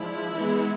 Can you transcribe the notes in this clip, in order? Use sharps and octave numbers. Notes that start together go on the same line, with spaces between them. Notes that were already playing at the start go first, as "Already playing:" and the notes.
Already playing: F3 G#3 D4 E4
E3 G#3 B3